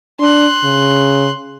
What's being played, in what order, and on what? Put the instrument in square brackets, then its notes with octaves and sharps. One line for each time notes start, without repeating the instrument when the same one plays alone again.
[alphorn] D4 [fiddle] C6 F#6
[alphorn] C#3